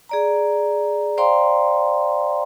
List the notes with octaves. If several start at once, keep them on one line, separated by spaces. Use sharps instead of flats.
G#4 D5 A#5
C5 D5 F5 G5 A#5 C6